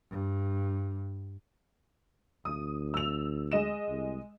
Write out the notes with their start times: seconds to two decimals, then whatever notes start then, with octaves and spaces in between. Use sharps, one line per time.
0.10 G2
2.45 D2 D#6
2.94 E6 F7
3.52 G#3 D#5 E7
3.89 C2